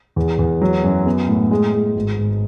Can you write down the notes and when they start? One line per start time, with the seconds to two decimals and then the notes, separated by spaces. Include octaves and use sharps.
0.16 E2
0.39 E2
0.61 F#3
0.84 F#2
1.06 B3
1.28 A2
1.51 G#3
1.73 G#3
1.96 G#1
2.18 G#1